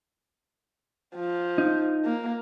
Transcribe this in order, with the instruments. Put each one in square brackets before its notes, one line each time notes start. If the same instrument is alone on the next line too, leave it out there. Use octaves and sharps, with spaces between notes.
[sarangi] F3
[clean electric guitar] D#4
[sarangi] A#3